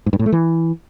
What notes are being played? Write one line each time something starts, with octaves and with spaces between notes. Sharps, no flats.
G#2
G2
A2
A3
E3